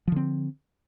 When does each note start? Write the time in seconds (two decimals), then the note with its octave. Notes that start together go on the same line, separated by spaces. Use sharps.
0.07 F3
0.12 D3
0.16 C4